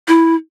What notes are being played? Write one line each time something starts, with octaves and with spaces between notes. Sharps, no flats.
E4